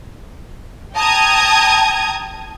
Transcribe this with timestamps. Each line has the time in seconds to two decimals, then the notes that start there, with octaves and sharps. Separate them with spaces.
0.96 G5 A5 A#5 D#6 G#6